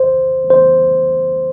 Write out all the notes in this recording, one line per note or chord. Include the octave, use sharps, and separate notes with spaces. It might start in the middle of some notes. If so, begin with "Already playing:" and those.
Already playing: C5
C5